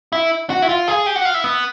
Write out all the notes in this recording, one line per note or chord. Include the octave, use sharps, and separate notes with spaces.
E4
F#4
E4
F4
G#4
G4
F#4
F4
E4
B3